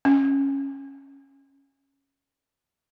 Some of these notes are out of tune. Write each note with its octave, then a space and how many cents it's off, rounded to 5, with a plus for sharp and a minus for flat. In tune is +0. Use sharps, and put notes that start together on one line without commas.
C#4 -10